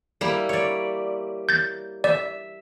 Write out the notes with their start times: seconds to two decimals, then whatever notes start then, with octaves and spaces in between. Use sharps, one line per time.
0.21 G3 A#3 E4
0.49 C#5 D5
1.49 G6 A6
2.04 D5 E5